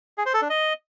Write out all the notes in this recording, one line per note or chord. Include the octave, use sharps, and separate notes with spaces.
G#4
C5
A4
D4
D#5